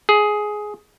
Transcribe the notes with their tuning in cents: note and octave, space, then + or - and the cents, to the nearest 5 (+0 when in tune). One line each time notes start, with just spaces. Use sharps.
G#4 +10